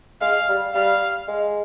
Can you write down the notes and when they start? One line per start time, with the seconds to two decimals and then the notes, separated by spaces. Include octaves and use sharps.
0.21 G#3 F5
0.49 G3
0.74 G3 F5
1.28 G#3